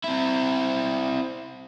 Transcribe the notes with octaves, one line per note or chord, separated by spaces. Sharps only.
C4 E4